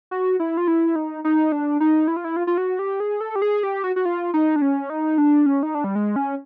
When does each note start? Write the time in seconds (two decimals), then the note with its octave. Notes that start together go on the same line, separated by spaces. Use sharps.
0.11 F#4
0.40 E4
0.57 F4
0.68 E4
0.96 D#4
1.24 D#4
1.52 D4
1.80 D#4
2.08 E4
2.17 F4
2.24 E4
2.36 F4
2.47 F4
2.58 F#4
2.79 G4
3.00 G#4
3.21 A4
3.36 G4
3.42 G#4
3.63 G4
3.84 F#4
3.96 F#4
4.05 F4
4.34 D#4
4.56 D4
4.62 C#4
4.90 D#4
5.18 D4
5.46 C#4
5.63 D#4
5.75 D4
5.84 G3
5.95 G#3
6.16 C#4